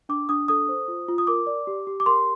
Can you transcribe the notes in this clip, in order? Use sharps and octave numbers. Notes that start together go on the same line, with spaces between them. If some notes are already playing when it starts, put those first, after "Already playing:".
D4 D6
D4 D#6
A4 D#6
C5
F4
F4
D#6
A#4 D6
D5
G4
G4
D6
A#4 C6